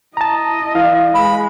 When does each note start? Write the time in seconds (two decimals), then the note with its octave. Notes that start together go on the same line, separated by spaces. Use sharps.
0.17 E4 D#5 A5 A#5
0.75 E3 F5
1.15 G#3 B5